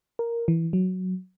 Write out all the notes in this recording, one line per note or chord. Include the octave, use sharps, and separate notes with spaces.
A#4
E3
F#3